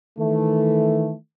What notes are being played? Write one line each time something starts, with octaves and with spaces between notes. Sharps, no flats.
D#3 E3 A3